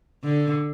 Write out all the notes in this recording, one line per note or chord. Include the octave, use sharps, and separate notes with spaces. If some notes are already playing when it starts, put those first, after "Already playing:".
D3